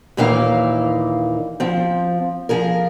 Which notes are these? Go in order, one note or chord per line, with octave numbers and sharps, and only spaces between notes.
D#2 A#2 E3 A#3 D#4 F5
F3 C4
F3 G#4 A#4